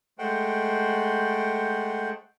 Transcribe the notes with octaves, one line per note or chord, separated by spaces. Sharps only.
G#3 A3 C5 F#5 G5